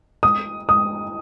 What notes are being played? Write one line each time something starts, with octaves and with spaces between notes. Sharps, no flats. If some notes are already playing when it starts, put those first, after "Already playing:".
D#6
D#6